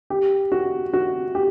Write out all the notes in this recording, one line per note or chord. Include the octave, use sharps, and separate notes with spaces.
G4
F#4
F#4
G4